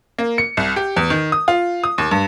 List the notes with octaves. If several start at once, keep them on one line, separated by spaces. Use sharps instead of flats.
A#3
C#7
C2
G4
E2
D#3
D#6
F4
D#6
D#2
G2